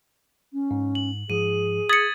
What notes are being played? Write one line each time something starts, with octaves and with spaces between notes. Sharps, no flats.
C#4
G#2
F#7
G#2 F3 G#4 D#7
D#6 G#6 A6 B6 C#7 F#7